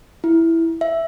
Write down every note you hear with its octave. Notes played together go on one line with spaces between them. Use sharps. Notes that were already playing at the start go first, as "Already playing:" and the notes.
E4
E5